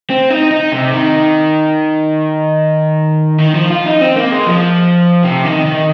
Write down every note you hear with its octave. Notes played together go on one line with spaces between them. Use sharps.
C4
D#4
D#4
C3
D#3
D#3
F3
F4
D#4
C4
A#3
G#3
F3
C3
D#3
D#3